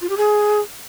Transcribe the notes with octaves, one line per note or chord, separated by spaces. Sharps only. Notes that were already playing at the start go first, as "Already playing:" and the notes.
F4
G4
G#4